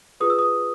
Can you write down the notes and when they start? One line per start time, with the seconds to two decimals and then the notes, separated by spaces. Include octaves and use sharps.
0.20 F4 G#4 B4 D#6
0.30 E6
0.39 D#6